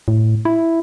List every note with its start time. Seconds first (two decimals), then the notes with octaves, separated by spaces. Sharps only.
0.08 A2
0.45 E4